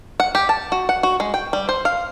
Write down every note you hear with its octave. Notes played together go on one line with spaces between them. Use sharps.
F#5
G4
A5
F#4
F#5
F#4
G#3
G5
G3
C5
F5